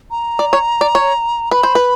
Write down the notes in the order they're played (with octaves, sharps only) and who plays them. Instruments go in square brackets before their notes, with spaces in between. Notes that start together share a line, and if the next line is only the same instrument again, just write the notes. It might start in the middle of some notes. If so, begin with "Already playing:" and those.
[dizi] A#5
[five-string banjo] D5
C#5
D5
C#5
[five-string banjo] B4 [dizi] B5
[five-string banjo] C5
B4